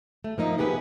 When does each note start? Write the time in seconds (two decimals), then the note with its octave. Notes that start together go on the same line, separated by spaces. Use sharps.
0.24 A3
0.38 F3 A#3 D#4 E5
0.58 B3 G4 G#4 B4